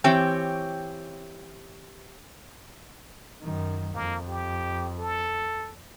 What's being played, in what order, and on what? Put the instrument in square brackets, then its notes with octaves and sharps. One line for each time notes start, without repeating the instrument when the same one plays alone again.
[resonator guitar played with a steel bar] E3 C4 G4 C#5 G5
[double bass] F#2 D#3
[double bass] F2 [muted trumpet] A#3
[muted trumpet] G4
A4